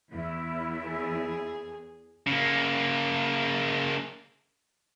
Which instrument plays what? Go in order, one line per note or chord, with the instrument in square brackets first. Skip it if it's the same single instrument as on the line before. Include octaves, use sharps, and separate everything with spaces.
[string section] E2 [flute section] E4
[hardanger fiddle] G#4
[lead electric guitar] C#3 A#3